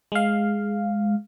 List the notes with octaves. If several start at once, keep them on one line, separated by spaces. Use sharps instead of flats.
G#3 F5